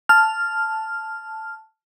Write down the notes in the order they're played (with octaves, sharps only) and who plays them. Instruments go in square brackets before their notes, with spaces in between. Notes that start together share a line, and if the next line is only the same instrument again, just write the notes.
[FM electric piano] A5 F6